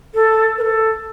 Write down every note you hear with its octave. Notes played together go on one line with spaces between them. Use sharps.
A4
B4
A4